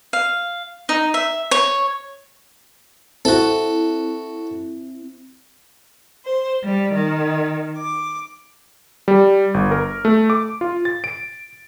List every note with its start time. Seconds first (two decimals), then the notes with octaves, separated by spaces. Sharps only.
0.13 F5
0.89 D#4
1.14 E5
1.51 C#5
3.25 C4 E4 F#4 A4
6.26 C5
6.63 G3
6.94 D#3
7.78 D6
9.08 G3
9.54 G1
9.71 A#4
10.05 A3
10.30 D6
10.61 F4
10.85 A6
11.04 D7